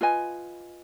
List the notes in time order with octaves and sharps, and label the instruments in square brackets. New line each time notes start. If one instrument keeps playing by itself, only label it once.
[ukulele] F4 B4 D#5 G#5